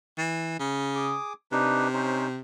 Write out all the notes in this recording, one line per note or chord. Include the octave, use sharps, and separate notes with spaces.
E3
C#3
G#4 D6 D#6
C3 D4 D#4 B4
C#4 D#4 C5